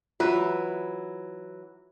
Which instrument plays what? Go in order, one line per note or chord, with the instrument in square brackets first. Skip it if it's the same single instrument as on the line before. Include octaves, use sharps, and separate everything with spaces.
[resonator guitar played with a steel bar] E3 F#3 [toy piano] F4 [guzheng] B4 E5